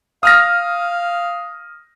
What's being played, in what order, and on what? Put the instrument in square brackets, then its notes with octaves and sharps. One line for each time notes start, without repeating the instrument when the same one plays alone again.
[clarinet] F5 [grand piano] D#6 F6 A#6